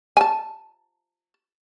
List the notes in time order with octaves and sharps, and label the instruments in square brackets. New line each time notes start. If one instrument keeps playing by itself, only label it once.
[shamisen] G#5 A5